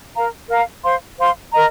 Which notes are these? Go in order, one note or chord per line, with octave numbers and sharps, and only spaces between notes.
A#4 F5 A#5
A#4 F5 A#5
C5 F5 C6
C5 F5 C6
A#4 D#5 A#5